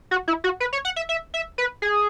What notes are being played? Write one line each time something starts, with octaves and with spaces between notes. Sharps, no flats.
F#4
E4
F#4
B4
C#5
F#5
E5
E5
E5
B4
G#4